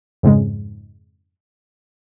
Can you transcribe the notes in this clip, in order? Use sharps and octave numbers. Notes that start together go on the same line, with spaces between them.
F2 G#2 C#3 G#3